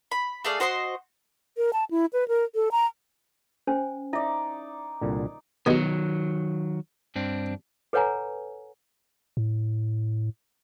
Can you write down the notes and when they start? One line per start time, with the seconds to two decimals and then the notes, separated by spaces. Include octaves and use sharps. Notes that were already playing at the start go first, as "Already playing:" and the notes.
0.11 B5
0.45 A3 G#4 D5 F5
0.60 F#4 C5 D#5 C6
1.57 A#4
1.73 A5
1.91 E4
2.13 B4
2.28 A#4
2.55 A4
2.72 A#5
3.67 C#4 C5 G#5
4.13 D#4 E4 D5 E5
5.01 C2 A#2 D3
5.66 B2 D#3 F#3 G#3 B3
7.16 G2 C4 D4
7.93 A4 B4 C#5 F#5 G#5 A#5
9.37 A2